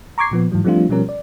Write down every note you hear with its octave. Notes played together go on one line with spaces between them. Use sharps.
A#5 C#6 D6 G#6 C7
A#2 F3 B3
G#2 E3 F#3
F3 G3 A3 C4 D4 F4
B2 F3 G3 C#4 A#4
D5